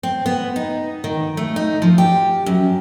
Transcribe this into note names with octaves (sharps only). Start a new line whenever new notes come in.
C4
B3
D#4
D#3
A3
D#4
F3
G4
F#2